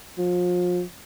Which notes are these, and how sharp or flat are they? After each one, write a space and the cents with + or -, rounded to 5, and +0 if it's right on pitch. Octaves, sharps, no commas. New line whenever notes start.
F3 +35